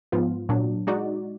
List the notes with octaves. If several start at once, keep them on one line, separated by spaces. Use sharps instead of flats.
G#2 F3 B3 F4
A#2 F#3 D4
G#3 D#4 F#4 D5